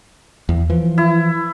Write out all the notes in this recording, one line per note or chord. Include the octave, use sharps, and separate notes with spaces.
E2
E3 F3
E4